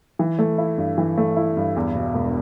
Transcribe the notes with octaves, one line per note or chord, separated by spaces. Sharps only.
E3
A3
E4
G2
E3
A3
E4
G2
E2
B2
E1